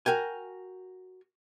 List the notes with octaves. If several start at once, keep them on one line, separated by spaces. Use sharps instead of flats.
F#4 A#4 G5 G#5